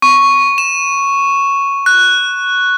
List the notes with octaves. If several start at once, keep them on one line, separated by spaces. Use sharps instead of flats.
C#6
E7
F#6